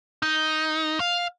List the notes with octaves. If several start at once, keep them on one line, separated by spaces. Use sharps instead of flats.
D#4
F5